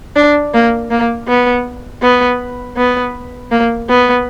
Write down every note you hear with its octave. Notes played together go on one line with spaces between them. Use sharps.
D4
A#3
A#3
B3
B3
B3
A#3
B3